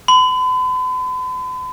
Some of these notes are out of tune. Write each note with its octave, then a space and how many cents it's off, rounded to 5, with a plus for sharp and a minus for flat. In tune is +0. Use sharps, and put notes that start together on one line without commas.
B5 +45